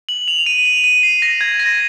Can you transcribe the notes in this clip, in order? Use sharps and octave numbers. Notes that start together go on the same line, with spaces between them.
F#7
F7
F7
D#7
F7
D#7
C7
A#6
G#6
A#6